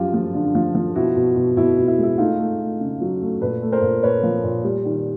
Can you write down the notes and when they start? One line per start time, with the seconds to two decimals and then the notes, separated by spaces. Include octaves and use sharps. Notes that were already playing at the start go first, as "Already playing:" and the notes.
Already playing: F#2 F3 F4 G4
0.14 F3
0.34 D3
0.55 F3
0.75 F3
0.95 B2 E4 F#4
1.16 B2
1.36 B2
1.57 B2 E4
1.78 B2
1.88 E4
1.98 G#3
2.03 E4
2.18 A3 D#4 F4
2.38 A3
2.59 A3
2.80 C#3
3.01 F#3
3.21 A3
3.41 A#2 A4 B4
3.62 A3
3.72 A#4 C5
3.82 A#2
4.03 A#2 B4 C#5
4.23 F3
4.44 A#2
4.64 G3
4.85 D#3